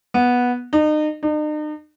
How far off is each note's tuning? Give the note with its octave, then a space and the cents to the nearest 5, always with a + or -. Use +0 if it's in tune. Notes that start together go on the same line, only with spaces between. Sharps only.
B3 -10
D#4 -35
D#4 -45